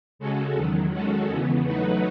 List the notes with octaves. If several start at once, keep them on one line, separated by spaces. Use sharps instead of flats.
C#3 G#3 C#4 F#4 A4
E2 D#3 F#3
D#3 G#3 C#4 F#4 A4
E2 C#3 E3 B3
F#3 A3 D#4 F#4 B4